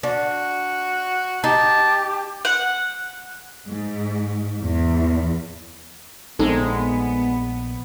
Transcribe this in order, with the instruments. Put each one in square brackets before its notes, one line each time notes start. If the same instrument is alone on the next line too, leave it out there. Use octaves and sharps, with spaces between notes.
[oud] D4 [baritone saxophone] F#4
[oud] D#4 [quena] G4 [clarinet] A5
[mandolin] F#5
[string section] G#2
E2
[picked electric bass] A#1 [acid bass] G#3 [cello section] B3 [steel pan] C4 D#4 A4